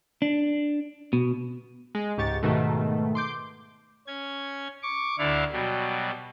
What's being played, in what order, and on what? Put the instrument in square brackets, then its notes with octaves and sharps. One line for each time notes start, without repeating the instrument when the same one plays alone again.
[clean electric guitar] D4
B2
[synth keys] G#3
C#2 G#2 G4 C#6 A6
G#2 B2 D#3 A3
C6 D6 G6
[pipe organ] C#4 G#6
C#6 D6
D2 D3 D4 E4 F5
B2 F#3 G3